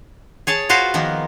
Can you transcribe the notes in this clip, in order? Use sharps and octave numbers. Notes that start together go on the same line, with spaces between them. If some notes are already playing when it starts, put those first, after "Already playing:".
G#4 C#5 A5
F4 F#4 B4 C5 F5
D#3 F3 A#3 B3